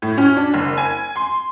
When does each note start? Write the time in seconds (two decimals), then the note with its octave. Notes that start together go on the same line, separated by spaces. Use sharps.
0.02 A2
0.17 C#4
0.37 D4
0.54 F#1
0.77 G#5
1.16 C6